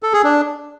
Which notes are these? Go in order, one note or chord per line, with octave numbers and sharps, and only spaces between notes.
A4
G#4
D4